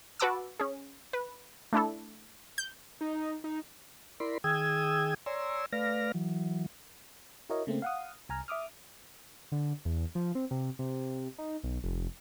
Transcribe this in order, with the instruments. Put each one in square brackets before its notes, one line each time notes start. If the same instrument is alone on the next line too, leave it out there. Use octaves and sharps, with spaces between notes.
[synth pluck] F#4 B4 F#5 A5 D6 E6
C#4 G#4
B4
A3 D4 E4 A4
G6
[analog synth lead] D#4
D#4
[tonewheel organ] E4 A#4 D5 B5 C6
D#3 G#4 G5 D#6 E6 G#6
C#5 D5 G#5 A#5 C6 E6
A3 B4 D5 F5 F6 A#6
E3 F#3
[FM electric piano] E4 F#4 A#4 C#5 D#5
C#3 A3 A#3 C4
F5 F#5 D#6
C2 G#5 A#5 F6
E5 D6 D#6 F6
[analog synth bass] D3
E2
F3
C4
C3
C3
D#4
B1
F1